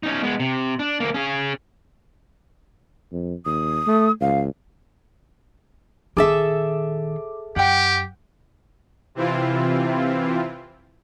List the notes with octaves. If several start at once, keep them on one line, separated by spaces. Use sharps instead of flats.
C#4 D#4
G#3 B3
C3
D4
D2 A#3
C#4 G#4
F2
D#2 D#6
A3
C#2 F5
A#1 D#3 G#4 A4 E5 D6
F#2 G4 F#5 G5
C3 E3 C4 E4 F4